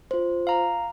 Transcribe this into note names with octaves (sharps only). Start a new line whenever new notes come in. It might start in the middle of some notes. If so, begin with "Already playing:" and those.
F4 C5
F5 A#5